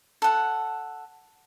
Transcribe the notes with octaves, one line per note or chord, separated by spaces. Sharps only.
A4 F#5